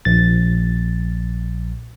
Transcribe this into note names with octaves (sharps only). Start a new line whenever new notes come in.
A#1 A6